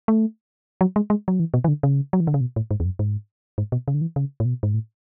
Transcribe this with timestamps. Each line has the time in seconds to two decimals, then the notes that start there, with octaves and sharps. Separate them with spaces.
0.08 A3
0.81 F#3
0.96 G#3
1.10 G#3
1.28 F#3
1.40 E3
1.54 B2
1.64 E3
1.68 D3
1.83 C#3
2.13 F#3
2.20 E3
2.27 D3
2.34 C#3
2.41 B2
2.56 A2
2.71 G#2
2.80 E2
2.85 F#2
2.99 G#2
3.58 G#2
3.72 B2
3.88 C#3
3.94 D3
4.01 E3
4.16 C#3
4.40 A2
4.45 B2
4.63 G#2
4.74 A2